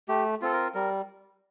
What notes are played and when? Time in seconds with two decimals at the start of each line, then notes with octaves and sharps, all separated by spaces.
0.08 A3 G4
0.42 C4 F4 A4
0.53 A#4
0.74 G3 A#4